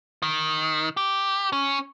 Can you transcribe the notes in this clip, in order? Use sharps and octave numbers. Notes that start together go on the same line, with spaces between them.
D#3
G4
C#4